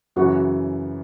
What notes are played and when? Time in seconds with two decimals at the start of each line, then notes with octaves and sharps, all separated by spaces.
0.16 F#2 C#3 E3 F#4